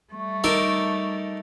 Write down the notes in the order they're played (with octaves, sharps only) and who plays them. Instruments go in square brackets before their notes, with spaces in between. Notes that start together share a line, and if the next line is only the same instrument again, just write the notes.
[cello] G3 A3 [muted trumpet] C#6
[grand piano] D#4 [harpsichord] A4 A#4 D6